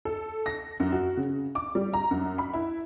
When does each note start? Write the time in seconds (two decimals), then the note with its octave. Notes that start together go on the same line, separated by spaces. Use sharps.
0.05 A4
0.46 A#6
0.80 F#2
0.92 F#4
1.17 C#3
1.55 D6
1.75 G3
1.93 A#5
2.11 F#2
2.38 B5
2.53 E4